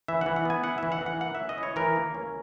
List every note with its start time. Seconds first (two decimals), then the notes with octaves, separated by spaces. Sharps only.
0.08 E3 E5
0.21 E3 F#5
0.36 F#5
0.45 B3 G#5
0.64 E4 F#5
0.78 E3 E5
0.92 F#5
1.01 E3
1.06 F#5
1.20 A#3 F#5
1.35 E5
1.40 C#4
1.49 D#5
1.58 E4 C#5
1.76 E3 A#4
1.96 A#3
2.15 C#4